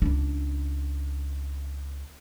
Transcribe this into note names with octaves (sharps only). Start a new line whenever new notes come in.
C#2 D4